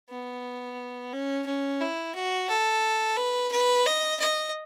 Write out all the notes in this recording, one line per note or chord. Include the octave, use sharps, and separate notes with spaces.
B3
C#4
C#4
E4
F#4
A4
B4
B4
D#5
D#5